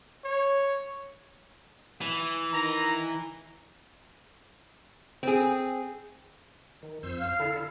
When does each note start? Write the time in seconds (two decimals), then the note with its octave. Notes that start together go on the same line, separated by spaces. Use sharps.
0.24 C#5
2.01 E3
2.53 D#3 A#5
5.23 C4 G#4
6.83 D#3
7.03 F2 C5 E6
7.19 F5
7.40 D3 E4 A4